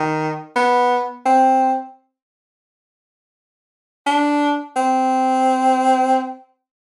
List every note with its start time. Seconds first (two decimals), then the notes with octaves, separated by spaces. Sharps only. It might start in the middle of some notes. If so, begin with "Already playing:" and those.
Already playing: D#3
0.56 B3
1.26 C4
4.07 D4
4.76 C4